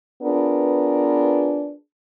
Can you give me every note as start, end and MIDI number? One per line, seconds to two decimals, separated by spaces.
0.23 1.73 59
0.23 1.73 62
0.23 1.73 65
0.23 1.73 68
0.23 1.73 70
0.23 1.73 71